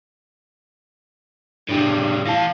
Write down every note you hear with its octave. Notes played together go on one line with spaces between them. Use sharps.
A2 G3 D4
E3 F5 A5